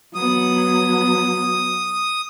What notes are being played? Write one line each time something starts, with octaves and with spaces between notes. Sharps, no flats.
F#3 B3 D#6